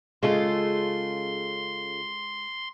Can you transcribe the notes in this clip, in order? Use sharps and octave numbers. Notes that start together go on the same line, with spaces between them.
C#3 G#3 F4 A4 C6